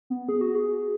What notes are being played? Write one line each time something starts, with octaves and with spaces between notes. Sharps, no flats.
B3
G#4
F#4
G#4